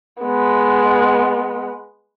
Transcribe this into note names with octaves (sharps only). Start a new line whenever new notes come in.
G#3 B3